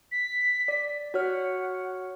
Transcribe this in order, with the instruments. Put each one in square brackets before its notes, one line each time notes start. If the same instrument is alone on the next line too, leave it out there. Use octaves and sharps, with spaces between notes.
[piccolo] B6
[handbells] D5
[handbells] F#4 C#5 F6 [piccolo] F#5